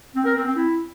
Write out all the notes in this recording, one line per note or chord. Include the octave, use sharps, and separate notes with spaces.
C4
A#4
C4
C4
E4